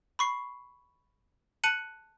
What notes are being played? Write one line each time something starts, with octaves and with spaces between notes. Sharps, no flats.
B5 C#6 C7
A5 F#6 C#7 D#7 F#7